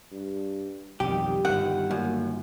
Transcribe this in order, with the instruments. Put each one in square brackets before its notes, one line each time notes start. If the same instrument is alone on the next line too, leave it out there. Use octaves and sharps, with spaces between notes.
[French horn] G2
[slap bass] B1 F2 D#3 [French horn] G3 [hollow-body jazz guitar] G4
[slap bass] G1 D#3 [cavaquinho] F#5
[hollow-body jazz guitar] F#2 [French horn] A#3